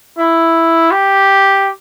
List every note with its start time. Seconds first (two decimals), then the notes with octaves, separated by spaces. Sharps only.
0.18 E4
0.91 G4